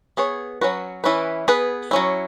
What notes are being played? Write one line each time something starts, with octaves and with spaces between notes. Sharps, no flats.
B3 G#4 C#5
F#3 C#4 F#4 B4
E3 C#4 E4 B4
B3 G#4 B4
F#3 C#4 E4